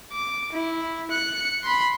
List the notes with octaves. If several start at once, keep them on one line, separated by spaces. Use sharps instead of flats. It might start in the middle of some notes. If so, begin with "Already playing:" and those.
D6
E4
F#6 C#7
B5 C6